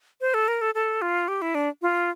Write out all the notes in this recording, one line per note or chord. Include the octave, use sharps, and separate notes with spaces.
C5
A4
A#4
A4
A4
F4
G4
E4
D4
F4